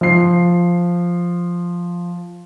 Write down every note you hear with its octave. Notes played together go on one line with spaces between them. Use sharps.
F3 C7